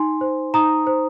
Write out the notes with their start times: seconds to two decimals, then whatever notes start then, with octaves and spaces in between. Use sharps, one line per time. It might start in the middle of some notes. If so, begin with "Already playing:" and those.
Already playing: D#4 G#5 C6
0.21 C5
0.54 D#4 A#5 D#6
0.87 C5